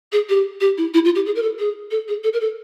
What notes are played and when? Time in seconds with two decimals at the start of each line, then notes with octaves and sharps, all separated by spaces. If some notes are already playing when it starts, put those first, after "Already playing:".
0.12 G#4
0.29 G4
0.60 G4
0.77 E4
0.94 E4
1.04 F4
1.15 G4
1.26 G#4
1.35 A#4
1.42 A4
1.59 G#4
1.90 A4
2.08 G#4
2.23 A4
2.33 A#4
2.40 A4